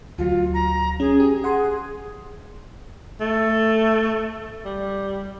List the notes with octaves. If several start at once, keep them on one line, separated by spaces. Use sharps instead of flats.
D2 F#3 F4
A#5
C#4 G#4
G4
G#4 F#5 C6
A3
G3